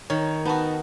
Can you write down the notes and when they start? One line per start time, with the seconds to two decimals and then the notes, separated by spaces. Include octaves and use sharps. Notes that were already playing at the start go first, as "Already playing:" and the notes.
0.10 D#3 C#5
0.45 B3 D#4 F#4 B4 A5